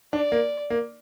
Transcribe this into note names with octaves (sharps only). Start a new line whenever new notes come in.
D4 D5
A#3
A#3